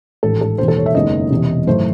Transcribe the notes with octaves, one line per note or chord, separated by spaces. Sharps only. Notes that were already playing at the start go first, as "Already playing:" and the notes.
A1 G#2 D#3 A4
A4
E1 D#2 D#3 C5
A4
C#5
E5
F#1 E2 D#3 G#3 D#5
E1 E2 C3
G#1 F#2 E3 A3 C5